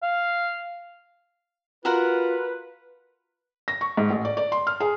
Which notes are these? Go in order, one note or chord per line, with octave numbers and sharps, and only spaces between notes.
F5
F4 F#4 A#4 B4 F#5
A#6
C#6
G#2
A1
D5
D5
C6
F6
G#4